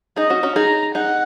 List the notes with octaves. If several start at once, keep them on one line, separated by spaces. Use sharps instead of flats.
D#4 G#4 D#5
C#4 F#4
C#4 F#4
D#4 G#4 A#5
D#4 G#4 F#5